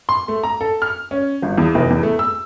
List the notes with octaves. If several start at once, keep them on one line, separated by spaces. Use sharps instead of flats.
C6
A3
A#5
A4
F6
C#4
G1
E2
F1
E2
A3
E6